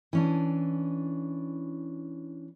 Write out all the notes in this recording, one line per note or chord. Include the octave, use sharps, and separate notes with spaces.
E3 C#4 D4